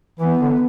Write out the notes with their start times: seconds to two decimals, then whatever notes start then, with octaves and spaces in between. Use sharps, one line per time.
0.20 E3 B3
0.41 D3